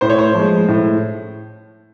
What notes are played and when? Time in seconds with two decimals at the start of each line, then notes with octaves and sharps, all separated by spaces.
0.01 A2 C5
0.10 C#5
0.18 C5
0.34 F3
0.39 G#3
0.68 A2